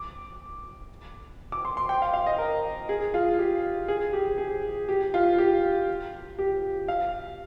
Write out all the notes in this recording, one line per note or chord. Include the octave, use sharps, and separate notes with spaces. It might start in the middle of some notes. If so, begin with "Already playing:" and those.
Already playing: D6
D6
C6
C6
G5
F5
F5
D#5
A#4
G#4
F4
G4
G#4
G4
G#4
G4
F4
G4
G4
F5